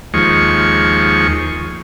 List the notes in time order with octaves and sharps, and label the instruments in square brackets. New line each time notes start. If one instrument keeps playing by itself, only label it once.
[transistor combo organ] D#2 F3 G#3 C#6